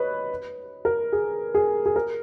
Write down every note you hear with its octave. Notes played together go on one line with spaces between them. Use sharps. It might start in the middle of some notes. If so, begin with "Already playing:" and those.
Already playing: B4 C#5 D#5
A#4
G#4
G#4
G#4
A#4